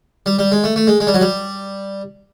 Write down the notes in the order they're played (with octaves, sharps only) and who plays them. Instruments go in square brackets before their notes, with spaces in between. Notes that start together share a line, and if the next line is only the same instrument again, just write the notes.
[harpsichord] G3
G3
G#3
A3
A3
G#3
G#3
G3
F#3
G3